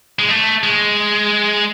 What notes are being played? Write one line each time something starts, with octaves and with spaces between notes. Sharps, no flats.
G#3
A3
G#3